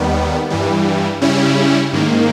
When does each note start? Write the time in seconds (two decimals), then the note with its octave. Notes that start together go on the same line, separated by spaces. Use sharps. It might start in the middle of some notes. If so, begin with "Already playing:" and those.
Already playing: D#2 D#3 G3 B3
0.50 G2 E3 G3
1.21 C#3 G3 C#4 E4
1.93 G#2 D#3 A#3